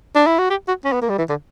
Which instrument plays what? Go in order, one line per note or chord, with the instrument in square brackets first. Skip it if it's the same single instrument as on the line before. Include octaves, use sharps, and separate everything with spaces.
[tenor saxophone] D4
E4
F#4
G4
F#4
C#4
B3
A#3
G3
E3
D3